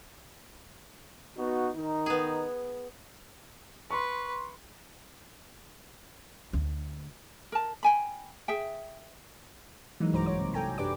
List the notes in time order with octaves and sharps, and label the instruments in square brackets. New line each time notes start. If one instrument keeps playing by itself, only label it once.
[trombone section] B3 D#4 F#4
D#3 D#4
[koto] B3 G#4
[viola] B4 [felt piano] C6 C#6
[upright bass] D2
[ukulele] A#4 A5
G5 G#5 B5
G#4 E5 G5
[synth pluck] E3 F#3 G#3 A#3 D#4
B1 G2 F#4 C5 A#5 D6
G#1 G2 C#5 D6
C3
A4 G5 G#5 A#5
F#2 D4 G4 B4 D5 D6